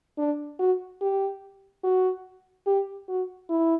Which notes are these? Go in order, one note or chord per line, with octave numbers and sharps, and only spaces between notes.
D4
F#4
G4
F#4
G4
F#4
E4